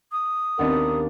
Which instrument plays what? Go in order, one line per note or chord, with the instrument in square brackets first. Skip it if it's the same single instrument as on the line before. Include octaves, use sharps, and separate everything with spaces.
[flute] D#6
[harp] D#2 B3 D4 [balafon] C4 D#5 F#5 [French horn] A#4